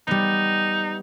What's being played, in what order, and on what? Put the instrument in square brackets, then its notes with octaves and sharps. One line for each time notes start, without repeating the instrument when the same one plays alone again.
[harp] G3 B3 [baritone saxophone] D#4